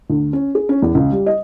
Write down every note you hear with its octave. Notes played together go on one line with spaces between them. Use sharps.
D2
C#4
G#4
C#4
E2
C#2
G3
D#5